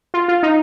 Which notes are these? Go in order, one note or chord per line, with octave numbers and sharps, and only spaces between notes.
F4
F4
D#4